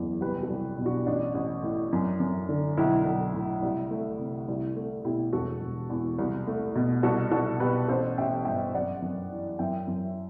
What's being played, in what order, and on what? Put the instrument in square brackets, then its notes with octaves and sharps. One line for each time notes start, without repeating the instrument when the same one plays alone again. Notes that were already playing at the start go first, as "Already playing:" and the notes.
Already playing: [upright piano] F#1 E2
C2 G4 B4
F#4 A4
C2
B2
D4 F#4
A1 D4
A1
A2
F#2
F#2
D3
B1 E4
B1
A2
C2
A3
C3
C2 E4
A3
B2 E4 G4
E1 F#4 A4
E1
E2
C2
A3
B2
C2 F#4 A4
C2 F#4 A4
B2 G4 B4
A1 A4 C5
A1 E5 G5
G2 E5 G5
F#2 D5 F#5
F#2
E3
F#2 E5 G5
F#2